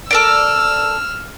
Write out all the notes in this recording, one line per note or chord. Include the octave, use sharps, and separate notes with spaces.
A4 A#4 D5 E6 F6